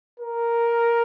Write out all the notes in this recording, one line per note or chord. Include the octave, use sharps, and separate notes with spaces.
A#4